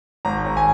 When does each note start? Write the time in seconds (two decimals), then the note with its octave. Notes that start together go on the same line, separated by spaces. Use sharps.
0.25 G#1 A#5
0.46 G#1
0.57 G#5